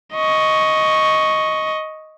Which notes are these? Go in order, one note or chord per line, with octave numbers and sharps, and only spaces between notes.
D#5 C#6